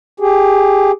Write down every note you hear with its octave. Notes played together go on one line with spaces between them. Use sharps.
G4 G#4